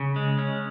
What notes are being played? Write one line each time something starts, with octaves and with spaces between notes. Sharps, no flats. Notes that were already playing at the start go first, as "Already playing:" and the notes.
Already playing: C#3
G#3
C#4